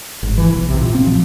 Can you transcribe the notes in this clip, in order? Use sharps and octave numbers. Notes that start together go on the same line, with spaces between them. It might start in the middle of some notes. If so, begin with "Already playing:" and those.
G#1
E3
B1
C3
A#2
C4
F3